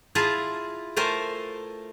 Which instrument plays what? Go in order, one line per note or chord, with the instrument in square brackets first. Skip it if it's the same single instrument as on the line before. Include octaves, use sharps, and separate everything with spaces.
[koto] E4 F4 G#4 A5 A#5
A3 A#4 C5 G#5 A5